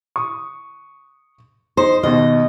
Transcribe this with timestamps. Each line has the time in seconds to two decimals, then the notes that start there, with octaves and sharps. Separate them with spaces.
0.16 C#6 D#6
1.77 D#4 C5
2.03 D#2 B2 D#3 D#5